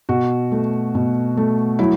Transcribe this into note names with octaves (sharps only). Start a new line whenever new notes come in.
B2 F#4
A3
B2
A3
F#3 E4